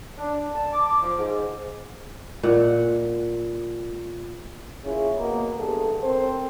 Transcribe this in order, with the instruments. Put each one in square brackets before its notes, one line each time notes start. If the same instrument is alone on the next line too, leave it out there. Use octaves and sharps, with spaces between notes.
[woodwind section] D4
A5
D6
F3
G#2
[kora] A#2 F#5
[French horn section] A#3 C#4 E4 F4 G#4
B2 A#3
E2 G2 G#4 A4
C4 A4 A#4 C5